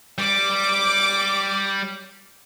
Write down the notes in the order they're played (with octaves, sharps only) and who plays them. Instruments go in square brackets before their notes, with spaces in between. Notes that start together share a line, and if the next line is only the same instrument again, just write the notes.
[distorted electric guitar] G3 [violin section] D6